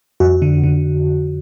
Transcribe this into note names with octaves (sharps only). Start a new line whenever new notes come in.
F2 F#4
D3
D3